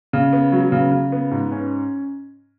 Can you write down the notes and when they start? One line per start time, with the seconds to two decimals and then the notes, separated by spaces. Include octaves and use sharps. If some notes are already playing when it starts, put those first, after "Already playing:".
0.13 C#3
0.33 B3
0.52 F#3
0.72 C#3
0.91 C#3
1.12 B3
1.31 G#2
1.51 C#4